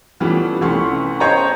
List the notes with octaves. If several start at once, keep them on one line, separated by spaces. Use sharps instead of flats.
E3 F3 G3 A3 B3 C#4
C2 A3 B3 C#4 C6 C#6
C5 C#5 D#5 F5 G5 A#5